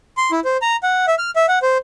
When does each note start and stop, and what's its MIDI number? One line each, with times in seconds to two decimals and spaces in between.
0.17 0.31 84
0.31 0.40 64
0.45 0.57 72
0.62 0.76 82
0.83 1.06 78
1.07 1.15 76
1.19 1.30 89
1.36 1.46 76
1.48 1.59 78
1.62 1.78 72